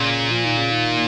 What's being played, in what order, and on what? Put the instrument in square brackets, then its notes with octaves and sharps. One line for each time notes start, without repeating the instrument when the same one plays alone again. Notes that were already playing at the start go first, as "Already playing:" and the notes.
Already playing: [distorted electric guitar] A#2 [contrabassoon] C#3
[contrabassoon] F3
D#3
C#3
D#3